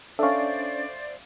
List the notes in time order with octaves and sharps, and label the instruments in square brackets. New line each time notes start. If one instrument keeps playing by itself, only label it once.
[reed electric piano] C#4 D4 [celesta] A4 C#6 [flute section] C5 D5 [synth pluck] E5 F5